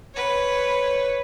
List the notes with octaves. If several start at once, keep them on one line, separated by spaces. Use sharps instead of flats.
B4 C#5